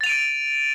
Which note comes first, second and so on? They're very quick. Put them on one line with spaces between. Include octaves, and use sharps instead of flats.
A6 F7 D#7 D7